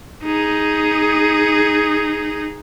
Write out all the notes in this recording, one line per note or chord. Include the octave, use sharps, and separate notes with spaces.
D#4 G#4